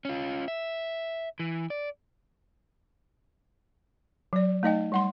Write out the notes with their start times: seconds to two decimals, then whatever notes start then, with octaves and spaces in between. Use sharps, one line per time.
0.05 C#4 F4
0.48 E5
1.40 E3
1.70 D5
4.33 F#3 D5
4.63 A3 D#4 D#5 G5
4.92 G3 F#5 C6